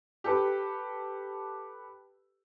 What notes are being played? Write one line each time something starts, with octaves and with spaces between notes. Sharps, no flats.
G4 A4 B4